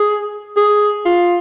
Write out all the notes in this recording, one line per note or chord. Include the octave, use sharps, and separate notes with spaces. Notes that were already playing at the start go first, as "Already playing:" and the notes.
Already playing: G#4
G#4
F4